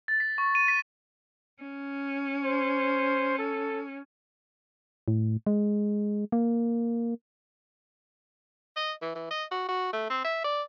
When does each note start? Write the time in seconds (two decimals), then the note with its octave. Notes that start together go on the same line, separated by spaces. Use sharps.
0.08 A6
0.20 B6
0.38 C#6
0.55 D#7
0.68 B6
1.62 C#4
2.44 C5
3.39 A4
5.08 A2
5.47 G#3
6.32 A#3
8.76 D#5
9.02 E3
9.15 E3
9.31 D#5
9.51 F#4
9.68 F#4
9.93 A3
10.10 C4
10.24 E5
10.44 D5